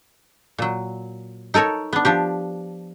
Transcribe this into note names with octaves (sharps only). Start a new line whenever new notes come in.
A#2 F#3
D#4 A4 A#4 C#5
B3 D4
F3 D4 G4